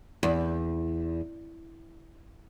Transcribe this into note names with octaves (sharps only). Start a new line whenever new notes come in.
E2